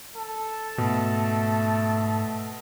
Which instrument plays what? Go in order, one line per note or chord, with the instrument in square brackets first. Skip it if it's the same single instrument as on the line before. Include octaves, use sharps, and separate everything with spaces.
[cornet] A4
[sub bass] G#2 [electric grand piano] B2 [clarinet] A3